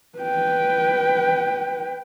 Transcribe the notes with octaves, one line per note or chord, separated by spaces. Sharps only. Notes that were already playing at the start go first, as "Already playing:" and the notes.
B4 G5